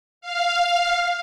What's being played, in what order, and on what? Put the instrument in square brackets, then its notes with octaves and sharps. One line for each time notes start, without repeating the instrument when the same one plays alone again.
[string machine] F5